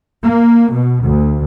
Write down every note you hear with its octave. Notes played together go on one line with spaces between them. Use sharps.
A#3
B2
D2